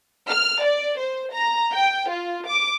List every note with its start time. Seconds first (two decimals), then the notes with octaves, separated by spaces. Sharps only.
0.28 F6
0.64 D5
1.00 C5
1.34 A#5
1.73 G5
2.11 F4
2.48 D6